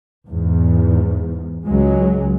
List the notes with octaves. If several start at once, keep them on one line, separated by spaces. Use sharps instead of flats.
E2 G#2
C#2 F#3 G#3